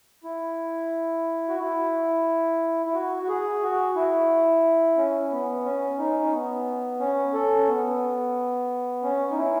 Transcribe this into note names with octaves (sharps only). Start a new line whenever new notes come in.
E4
F#4
E4
E4
F#4
F#4
G#4
F#4
E4
C#4
B3
C#4
D#4
C#4
B3
C#4
A4
C#4
B3
C#4
D#4
E4